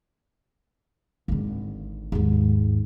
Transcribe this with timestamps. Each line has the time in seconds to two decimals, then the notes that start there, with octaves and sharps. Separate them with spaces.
1.28 G#1 D3
2.12 D#2 G#2